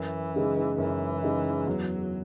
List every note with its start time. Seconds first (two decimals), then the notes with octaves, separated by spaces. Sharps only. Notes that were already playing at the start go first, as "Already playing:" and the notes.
Already playing: F#2 E3
0.34 C#3 G#3 D#4
0.78 F#2 E3
1.23 C#3 G#3 D#4
1.66 E2 F#3